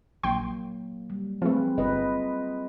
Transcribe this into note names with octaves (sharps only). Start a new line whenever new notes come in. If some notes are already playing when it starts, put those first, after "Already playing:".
A#1 F#3 A#3 G5 C6
G3
F3 A3 C4 G#4 B4
G1 F4 B4 D#5